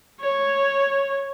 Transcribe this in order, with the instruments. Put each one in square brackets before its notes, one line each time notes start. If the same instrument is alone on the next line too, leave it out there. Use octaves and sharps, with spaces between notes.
[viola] C#5